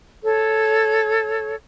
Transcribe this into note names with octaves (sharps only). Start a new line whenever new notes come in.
A4 C#5